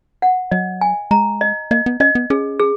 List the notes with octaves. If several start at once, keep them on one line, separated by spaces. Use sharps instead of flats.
F#5
F#3 D#5
G#5
G#3 A#5
D#5
A#3 D#5
B3
C#4 D#5
B3
C#4 G#4
G#4